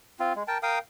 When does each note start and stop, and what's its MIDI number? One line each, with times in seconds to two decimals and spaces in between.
0.20 0.33 60
0.20 0.33 65
0.36 0.43 56
0.48 0.58 70
0.48 0.58 79
0.48 0.58 81
0.63 0.79 70
0.63 0.79 77
0.63 0.79 79
0.63 0.79 87